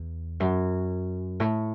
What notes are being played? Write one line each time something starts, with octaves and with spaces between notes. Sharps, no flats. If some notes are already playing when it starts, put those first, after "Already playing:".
Already playing: E2
F#2
A2